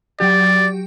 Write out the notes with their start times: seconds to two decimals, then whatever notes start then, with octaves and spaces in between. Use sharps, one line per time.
0.20 F#3 G4 D5